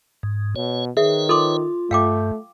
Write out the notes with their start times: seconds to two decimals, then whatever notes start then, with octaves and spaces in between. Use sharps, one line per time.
0.23 G#2
0.56 B2 C#5
0.97 D#3 G#4 B4 C#5 E5
1.29 F4 A4 C6 D6
1.91 G2 A3 F5 G5 D6